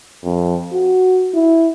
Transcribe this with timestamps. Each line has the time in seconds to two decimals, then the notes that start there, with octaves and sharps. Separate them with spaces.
0.24 F2
0.73 F#4
1.34 E4